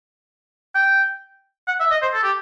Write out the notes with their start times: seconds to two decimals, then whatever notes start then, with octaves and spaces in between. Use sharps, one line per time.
0.75 G5
1.68 F#5
1.80 E5
1.91 D#5
2.02 C5
2.14 A4
2.23 G4